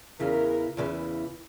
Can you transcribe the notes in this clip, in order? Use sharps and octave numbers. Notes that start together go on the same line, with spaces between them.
E2 C#3 E3 A#4
E2 C#3 E3